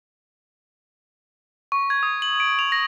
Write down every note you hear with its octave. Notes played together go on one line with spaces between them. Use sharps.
C#6
G#6
D#6
F#7
D7
F7
A#6